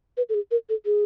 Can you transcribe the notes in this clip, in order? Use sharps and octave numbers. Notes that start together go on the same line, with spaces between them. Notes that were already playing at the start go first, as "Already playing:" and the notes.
B4
A4
G#4
A#4
A4
G#4